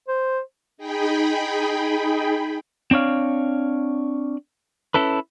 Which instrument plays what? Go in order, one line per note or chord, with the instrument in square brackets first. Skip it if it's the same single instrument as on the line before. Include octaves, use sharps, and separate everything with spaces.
[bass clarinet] C5
[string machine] D#4 G#4 G5 B5
[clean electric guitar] C4 D4 C#5 F5
C#4 E4 A4 B4